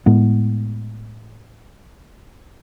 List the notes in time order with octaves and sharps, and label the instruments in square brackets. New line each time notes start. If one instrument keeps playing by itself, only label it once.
[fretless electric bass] A2 G#3 B3